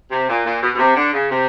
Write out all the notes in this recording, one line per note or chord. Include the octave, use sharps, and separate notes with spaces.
C3
A#2
A#2
B2
B2
C3
D3
C#3
C3